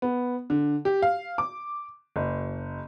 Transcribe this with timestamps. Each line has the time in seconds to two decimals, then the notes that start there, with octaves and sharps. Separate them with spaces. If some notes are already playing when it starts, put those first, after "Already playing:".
0.02 B3
0.50 D3
0.85 G4
1.02 F5
1.38 D6
2.16 F#1